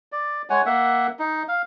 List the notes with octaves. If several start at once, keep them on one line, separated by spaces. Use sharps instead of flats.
D5
G#3 C#5 F#5 G#5
A#3 E5 F#5
D#4
F5